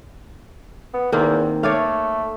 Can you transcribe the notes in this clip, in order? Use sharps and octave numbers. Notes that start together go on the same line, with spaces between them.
B3
E2 D#3 A#3 C4
A3 C#5 D5 F5